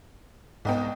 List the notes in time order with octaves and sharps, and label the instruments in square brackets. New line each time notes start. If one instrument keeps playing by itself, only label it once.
[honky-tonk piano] C2 D#5 G5 [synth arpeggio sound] G#2 B3